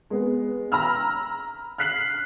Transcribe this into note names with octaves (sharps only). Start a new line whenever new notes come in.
G#3 B3
A#5 B5 E6 F6
F6 F#6 B6 C7 F#7